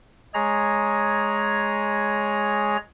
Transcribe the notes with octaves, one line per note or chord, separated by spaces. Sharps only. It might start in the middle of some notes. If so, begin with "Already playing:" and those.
G#3 G#4 C#5 A#5